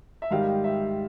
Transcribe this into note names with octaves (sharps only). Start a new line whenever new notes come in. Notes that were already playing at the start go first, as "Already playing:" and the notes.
E5
G#2 D#3 G3 F5
E5